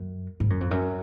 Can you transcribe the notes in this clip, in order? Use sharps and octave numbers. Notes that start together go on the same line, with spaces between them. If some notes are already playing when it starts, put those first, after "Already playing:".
Already playing: F#2
G#2
F#2
F2
F#2